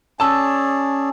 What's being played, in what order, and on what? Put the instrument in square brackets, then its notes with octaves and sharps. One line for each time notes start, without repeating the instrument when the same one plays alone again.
[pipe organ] C#4 [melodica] G#4 C#5 D5 [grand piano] A5 E6